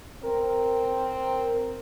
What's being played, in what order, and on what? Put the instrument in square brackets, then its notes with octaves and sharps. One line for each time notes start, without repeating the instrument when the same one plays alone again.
[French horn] C4 [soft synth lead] A#4